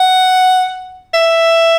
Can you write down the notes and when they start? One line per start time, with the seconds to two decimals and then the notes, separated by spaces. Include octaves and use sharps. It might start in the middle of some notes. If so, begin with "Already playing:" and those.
Already playing: F#5
1.14 E5